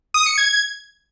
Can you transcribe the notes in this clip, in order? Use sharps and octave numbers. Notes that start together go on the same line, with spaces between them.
D#6
C#7
G#6